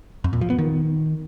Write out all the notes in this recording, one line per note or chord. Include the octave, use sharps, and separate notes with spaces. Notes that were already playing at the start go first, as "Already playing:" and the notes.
F2
A#2
F3
B3
D#3